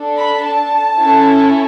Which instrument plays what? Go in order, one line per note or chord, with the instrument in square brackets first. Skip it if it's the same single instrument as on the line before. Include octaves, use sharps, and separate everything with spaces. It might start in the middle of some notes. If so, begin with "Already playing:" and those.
Already playing: [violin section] D4 A4
B5
A5
C#4 E4 A4